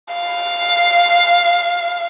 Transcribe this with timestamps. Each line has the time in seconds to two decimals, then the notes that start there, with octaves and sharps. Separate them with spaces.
0.14 F5